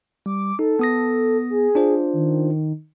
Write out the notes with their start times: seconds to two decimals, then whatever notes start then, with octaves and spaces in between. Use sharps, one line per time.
0.26 G3 D6
0.59 D#4 A4
0.79 B3 D#6 A#6
1.50 G#4
1.75 D4 F4 C5
2.13 D#3